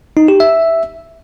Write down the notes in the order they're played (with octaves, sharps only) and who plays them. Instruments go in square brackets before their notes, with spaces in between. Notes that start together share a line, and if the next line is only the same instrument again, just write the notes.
[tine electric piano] D#4
G4
E5